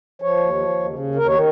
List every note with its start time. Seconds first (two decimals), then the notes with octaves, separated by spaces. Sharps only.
0.22 F3 C#5
0.37 D#2
0.54 F3
0.69 D#2
0.85 C#3
0.99 D#2
1.15 D#2 A#4
1.26 D#3 C#5